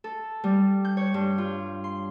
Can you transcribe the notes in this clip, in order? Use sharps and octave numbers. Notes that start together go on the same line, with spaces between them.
A4
G3
G6
C#5
G2
F4
C6